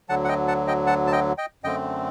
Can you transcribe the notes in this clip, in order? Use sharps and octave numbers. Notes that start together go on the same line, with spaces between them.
D2 D3 F#3 F#5 A5
F#5
D#5 G5
F#5 A5
D#5 G5
F#5 A5
A5
D#5 G5
D#5 G5
F#2 D3 A3 C4 D#5 G5